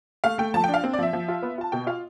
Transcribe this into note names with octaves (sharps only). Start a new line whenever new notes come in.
A3 F5
A3 G5
F3 A5
G5
D4
F5
C4
D5
F3 E5
F3
F4
B3
F4 A5
B2 G5
F4 F5